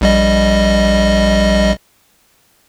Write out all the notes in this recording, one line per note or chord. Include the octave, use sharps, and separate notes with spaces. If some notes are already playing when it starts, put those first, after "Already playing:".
A#1 G3 D#5